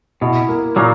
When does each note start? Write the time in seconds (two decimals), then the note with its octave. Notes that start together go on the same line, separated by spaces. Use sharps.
0.21 B2 E4
0.49 A#3
0.76 A#2 F#3 A#3